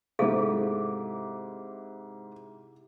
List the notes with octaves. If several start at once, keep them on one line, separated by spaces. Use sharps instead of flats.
G#2 C3 E4 G#4 A4 C5 F5 D6